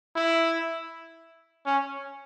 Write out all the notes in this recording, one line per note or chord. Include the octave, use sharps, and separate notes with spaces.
E4
C#4